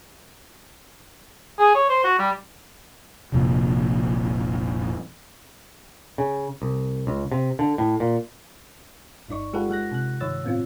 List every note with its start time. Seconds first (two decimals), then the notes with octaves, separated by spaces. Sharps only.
1.59 G#4
1.75 C#5
1.89 C5
2.04 F#4
2.19 G3
3.32 F1 C2 F2 A#2
6.18 C#3
6.62 C2
7.07 C#2
7.32 C3
7.59 D3
7.78 A2
8.00 A#2
9.28 G1 G2 D#4 D5 C#6
9.53 G#3 F4 G4 A4 B4 F#5
9.69 G#3 F#5 F#6 A#6
9.92 C3 F#6
10.20 G2 D#3 C#5 E6 A6
10.44 A2 B3 C4 F4